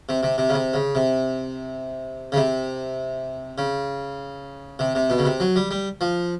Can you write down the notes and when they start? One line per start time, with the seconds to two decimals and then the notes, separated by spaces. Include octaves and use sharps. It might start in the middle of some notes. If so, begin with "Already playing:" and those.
0.09 C3
0.23 C3
0.38 C3
0.49 C#3
0.54 C3
0.74 C#3
0.95 C3
2.32 C#3
2.36 C3
3.58 C#3
4.79 C3
4.95 C3
5.10 B2
5.18 C#3
5.25 C3
5.40 F#3
5.56 G3
5.71 G3
6.01 F3